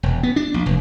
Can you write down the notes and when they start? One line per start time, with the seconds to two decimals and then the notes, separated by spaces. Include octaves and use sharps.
0.03 E1
0.23 B3
0.36 D4
0.54 A#1
0.66 F1